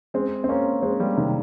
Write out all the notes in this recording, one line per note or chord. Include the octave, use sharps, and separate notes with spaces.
G#3 C4
C4
A#3 C#4
G#3 C4
G3 A#3
C3 D#3